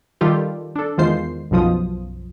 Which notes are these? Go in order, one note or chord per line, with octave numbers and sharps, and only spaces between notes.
D#3 G3 F4 G4 A4
D4 A4
E2 D#3 G#3 F4 C5 C7
B1 F#2 B2 F3 F4 D#6